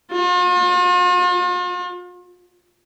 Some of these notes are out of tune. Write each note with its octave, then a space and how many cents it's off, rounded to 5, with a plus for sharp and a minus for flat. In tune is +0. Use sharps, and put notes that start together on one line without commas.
F4 +45